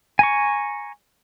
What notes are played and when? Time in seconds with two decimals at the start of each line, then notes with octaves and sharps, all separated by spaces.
0.19 G#5 A#5 C#6